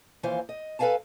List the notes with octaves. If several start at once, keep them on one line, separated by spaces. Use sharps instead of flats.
D#2 E3 F3 C5 F5 G#5
D#5
A4 B4 D#5 F5 G#5 A5